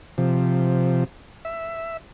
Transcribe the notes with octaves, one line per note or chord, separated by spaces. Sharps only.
C3 F3
E5